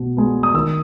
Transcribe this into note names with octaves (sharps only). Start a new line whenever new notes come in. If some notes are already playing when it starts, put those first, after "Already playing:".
Already playing: B2
G#3 B3
D#6
D#3 E6